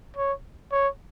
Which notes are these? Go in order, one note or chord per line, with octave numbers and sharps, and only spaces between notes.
C#5
C#5